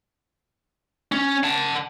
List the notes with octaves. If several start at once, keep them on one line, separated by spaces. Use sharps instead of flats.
C#4
F#5 A5